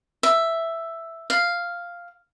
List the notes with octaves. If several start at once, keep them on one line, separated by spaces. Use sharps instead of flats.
E5
F5